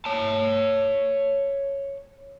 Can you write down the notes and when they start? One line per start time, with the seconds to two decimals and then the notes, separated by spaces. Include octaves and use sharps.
0.06 C#5 A5